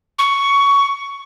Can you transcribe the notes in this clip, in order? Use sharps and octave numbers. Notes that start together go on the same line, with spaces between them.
C#6